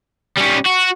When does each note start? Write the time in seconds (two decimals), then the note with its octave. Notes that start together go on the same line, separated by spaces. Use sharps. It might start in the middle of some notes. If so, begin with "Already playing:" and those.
0.37 G3 C#4
0.66 F#4